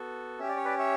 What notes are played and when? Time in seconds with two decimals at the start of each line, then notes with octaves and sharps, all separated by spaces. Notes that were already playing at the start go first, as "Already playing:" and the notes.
Already playing: B3 F#4 A4
0.39 C#4 G4 E5
0.49 D5
0.57 C#5
0.65 B4 D5
0.78 C#5 E5